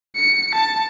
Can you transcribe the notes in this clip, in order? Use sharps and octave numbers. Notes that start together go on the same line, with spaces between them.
C#7
A5